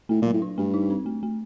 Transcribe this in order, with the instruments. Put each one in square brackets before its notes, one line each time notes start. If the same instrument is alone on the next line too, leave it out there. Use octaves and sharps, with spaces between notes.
[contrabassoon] A2 [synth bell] A3
[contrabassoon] A#2 [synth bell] F#3
[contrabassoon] A2
[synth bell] D4
[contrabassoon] G2 [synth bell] A3
[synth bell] D#4
C4
A3
A3